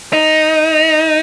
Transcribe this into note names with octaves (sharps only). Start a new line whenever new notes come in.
D#4